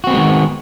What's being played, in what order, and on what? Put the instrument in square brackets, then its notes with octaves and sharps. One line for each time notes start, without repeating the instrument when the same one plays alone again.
[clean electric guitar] F#4
C4
B3
G#3
D#3